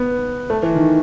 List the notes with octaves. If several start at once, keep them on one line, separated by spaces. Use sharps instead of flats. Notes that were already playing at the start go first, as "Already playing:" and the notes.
Already playing: B3
A3
E3
D#3